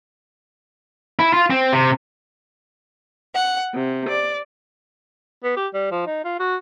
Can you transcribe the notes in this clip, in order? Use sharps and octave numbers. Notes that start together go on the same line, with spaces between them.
E4
F4
C4
C3
F#5
C3
D5
B3
G4
G3
F3
D#4
F4
F#4